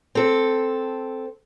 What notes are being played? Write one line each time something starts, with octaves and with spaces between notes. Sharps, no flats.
C4 A4